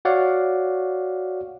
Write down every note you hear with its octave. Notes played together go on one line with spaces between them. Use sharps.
F#4 C#5 D5 F5 F#5